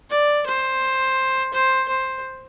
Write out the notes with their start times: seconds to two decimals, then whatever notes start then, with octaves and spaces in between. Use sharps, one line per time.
0.10 D5
0.46 C5
1.53 C5
1.88 C5